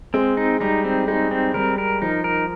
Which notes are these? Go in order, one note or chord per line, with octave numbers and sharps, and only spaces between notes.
G#3 C4
D#4
G3 D#4
C4
G#3 D#4
C4
G3 A#4
A#4
F3 D#4
A#4